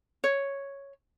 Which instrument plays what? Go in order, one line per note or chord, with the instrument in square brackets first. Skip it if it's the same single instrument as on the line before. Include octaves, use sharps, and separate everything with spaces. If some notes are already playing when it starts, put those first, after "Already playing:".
[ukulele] C#5